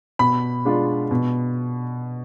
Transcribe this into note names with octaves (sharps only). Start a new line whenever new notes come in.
B2 B5
G#3 D4 F4
B2